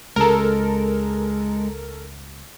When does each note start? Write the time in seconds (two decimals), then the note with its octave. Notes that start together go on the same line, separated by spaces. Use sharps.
0.16 C#2 G#3 A4 A#4